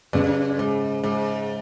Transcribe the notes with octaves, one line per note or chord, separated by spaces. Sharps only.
F#2 C#3
G#2 G#3
G#2 G#3